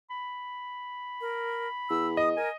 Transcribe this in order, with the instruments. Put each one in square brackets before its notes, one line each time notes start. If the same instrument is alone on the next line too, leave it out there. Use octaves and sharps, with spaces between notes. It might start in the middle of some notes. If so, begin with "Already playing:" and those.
[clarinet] B5
[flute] A#4
[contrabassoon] E2 [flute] E6
[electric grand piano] D#5 [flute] D#6
[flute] A#4 [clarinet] G#5